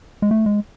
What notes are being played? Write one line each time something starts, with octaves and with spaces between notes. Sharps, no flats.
G#3
A3
G#3